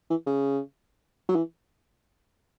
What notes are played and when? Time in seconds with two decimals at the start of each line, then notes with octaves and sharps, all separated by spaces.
0.10 E3
0.26 C#3
1.29 F#3
1.35 E3